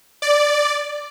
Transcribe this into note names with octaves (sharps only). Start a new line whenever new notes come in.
D5